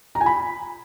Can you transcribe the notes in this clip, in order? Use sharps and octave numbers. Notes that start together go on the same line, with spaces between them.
A#5
G#5
B5